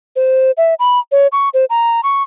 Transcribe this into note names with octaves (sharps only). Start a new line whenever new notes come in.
C5
E5
B5
C#5
C#6
C5
A#5
C#6